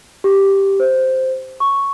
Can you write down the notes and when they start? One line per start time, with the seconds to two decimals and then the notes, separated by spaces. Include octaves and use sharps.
0.24 G4
0.80 C5
1.60 C#6